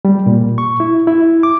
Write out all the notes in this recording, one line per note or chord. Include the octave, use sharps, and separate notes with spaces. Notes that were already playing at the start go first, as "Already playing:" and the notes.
G3
A#2
C#6
E4
E4
D6